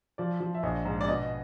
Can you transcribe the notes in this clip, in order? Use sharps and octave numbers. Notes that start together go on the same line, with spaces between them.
F3 D5
F3
E5
A#1 D#5
G#2
D5
B2 D#5